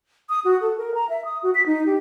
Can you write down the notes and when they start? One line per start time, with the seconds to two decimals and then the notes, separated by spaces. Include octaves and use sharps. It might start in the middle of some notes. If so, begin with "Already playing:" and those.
0.29 D#6
0.45 F#4
0.61 A4
0.78 A#4
0.95 A#5
1.10 E5
1.25 D#6
1.43 F#4
1.55 B6
1.66 D#4
1.86 G4